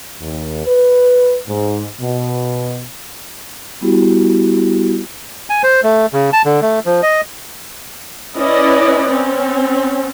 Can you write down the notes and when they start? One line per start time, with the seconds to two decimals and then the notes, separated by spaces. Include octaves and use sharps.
0.21 D#2
0.66 B4
1.48 G#2
2.00 B2
3.81 G3 B3 E4 F#4 G4
5.50 G#5
5.63 C5
5.83 A3
6.13 C#3
6.33 A5
6.45 D3
6.62 A3
6.86 F3
7.03 D#5
8.37 C#4 E4 B4 D5 D#5
9.09 C4 C#4